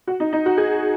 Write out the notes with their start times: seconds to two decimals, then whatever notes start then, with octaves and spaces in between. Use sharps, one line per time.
0.07 F#4
0.20 D#4
0.33 D#4
0.46 F#4
0.57 G#4